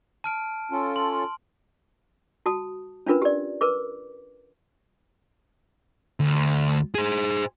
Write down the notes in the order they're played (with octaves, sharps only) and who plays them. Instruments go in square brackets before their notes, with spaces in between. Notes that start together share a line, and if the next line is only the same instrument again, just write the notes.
[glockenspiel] A5 F6 D7
[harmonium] C#4 F4 A4
[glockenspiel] C6
[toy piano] F#4 A5 D#6
C#4 D4 F4 A#4 B4
G4 D5
A#4 B4 D6
[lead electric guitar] D2
G#4 C5